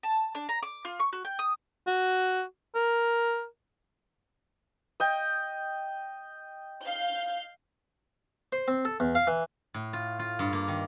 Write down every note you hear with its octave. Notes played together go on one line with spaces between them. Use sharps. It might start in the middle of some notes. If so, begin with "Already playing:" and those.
A5
D4
A#5
D6
F4
C#6
F#4
G5
D#6
F#4
A#4
D#5 G5
F5 G6
C5
C4
A4
E2
F5
E3
A2
F4
F4
G2
A#3
D#3